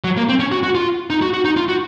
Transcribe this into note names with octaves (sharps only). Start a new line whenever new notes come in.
F#3
A#3
C4
C#4
F#4
F#4
F4
D#4
F#4
F#4
D#4
F4
F#4